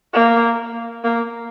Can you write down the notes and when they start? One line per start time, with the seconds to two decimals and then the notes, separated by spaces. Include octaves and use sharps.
0.14 A#3
1.04 A#3